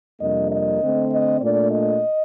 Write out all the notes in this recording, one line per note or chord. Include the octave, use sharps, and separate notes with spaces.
F2 C3 G3 A#3 D4 D#5
D#5
D3 A3 C4
D#5
A#2 A3 D4 D5
D#5